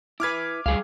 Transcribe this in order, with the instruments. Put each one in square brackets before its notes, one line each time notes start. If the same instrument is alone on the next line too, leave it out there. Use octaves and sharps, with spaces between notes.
[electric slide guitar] E4 B4 [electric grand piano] D6 F6 G#6
[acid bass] C#2 [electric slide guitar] G3 G#4 F5